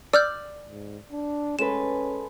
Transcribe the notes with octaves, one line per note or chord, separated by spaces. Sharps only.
D5 E6 F6 G6
G#2
D4
G#3 C#4 A4 B4 E7